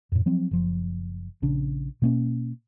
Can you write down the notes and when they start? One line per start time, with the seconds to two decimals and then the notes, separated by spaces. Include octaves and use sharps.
0.12 F2 A2
0.26 F3 F#3 C4
0.51 F#1 F3
1.42 A#1 C#3 D4
2.02 B2 A#3 C#4